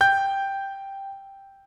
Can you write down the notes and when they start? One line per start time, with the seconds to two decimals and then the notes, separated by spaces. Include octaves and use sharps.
0.01 G5 G6